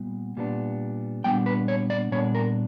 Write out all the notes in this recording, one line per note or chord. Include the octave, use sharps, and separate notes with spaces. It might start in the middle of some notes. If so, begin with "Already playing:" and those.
Already playing: A#2 G3 B3
A#2 G3 B3 D4
A#2 G3 B3 D4 G5
B4
C#5
D5
A#2 G3 B3 D4 C#5
A#4